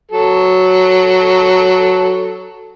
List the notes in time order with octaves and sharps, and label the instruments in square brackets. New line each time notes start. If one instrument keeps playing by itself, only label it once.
[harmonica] F#3 A4